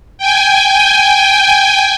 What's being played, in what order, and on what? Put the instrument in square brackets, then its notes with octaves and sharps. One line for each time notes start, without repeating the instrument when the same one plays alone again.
[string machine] G5 G#5